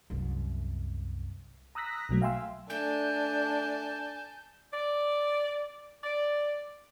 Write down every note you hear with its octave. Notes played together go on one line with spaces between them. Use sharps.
C2 F#2
A#5 D#6 E6 F#6 A#6 B6
B1 B2 F#3 A3
E5 F5 G5 G#5 C6 E6
A3 D4 G#5 A5 G6
D5
D5